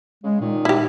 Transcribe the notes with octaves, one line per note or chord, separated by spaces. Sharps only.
C#3 G#3
A#2 D#3
E4 G4